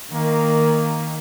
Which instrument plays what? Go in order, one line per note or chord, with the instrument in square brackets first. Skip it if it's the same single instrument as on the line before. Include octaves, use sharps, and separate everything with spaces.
[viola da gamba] D#3 [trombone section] A#3